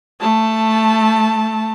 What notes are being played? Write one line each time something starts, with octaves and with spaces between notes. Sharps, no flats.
A3 A5